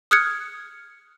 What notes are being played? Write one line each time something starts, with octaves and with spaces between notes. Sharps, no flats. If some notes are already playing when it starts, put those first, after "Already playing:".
D#6 F6 F#6 G#6 C#7